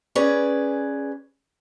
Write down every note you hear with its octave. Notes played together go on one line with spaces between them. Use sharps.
C#4 G#4 B4 D5